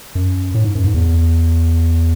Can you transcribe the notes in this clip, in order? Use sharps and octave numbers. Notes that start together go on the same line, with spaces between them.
F#2
A2
G#2
F#2
G#2
E2